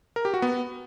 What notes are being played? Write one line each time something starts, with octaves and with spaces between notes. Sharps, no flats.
A#4
G4
F#4
B3